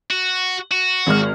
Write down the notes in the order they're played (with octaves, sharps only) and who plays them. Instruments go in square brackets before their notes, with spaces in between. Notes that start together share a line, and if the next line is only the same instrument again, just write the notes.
[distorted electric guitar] F#4
F#4
[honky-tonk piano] G#1 G#3 F6